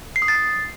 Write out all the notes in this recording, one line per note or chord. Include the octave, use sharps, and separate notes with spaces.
C7
D#6
A6
C7